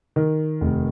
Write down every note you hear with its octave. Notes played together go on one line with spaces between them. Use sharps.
D#3
F1